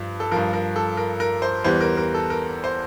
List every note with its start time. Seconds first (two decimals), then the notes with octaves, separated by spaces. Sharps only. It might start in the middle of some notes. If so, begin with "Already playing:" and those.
Already playing: G2 F3
0.20 A4
0.31 G2 F3 A#4
0.53 A#4
0.76 A4
0.97 A#4
1.20 A#4
1.42 C5
1.64 E2 E3 G3 C5
1.81 A#4
1.97 A#4
2.14 A4
2.30 A#4
2.64 C5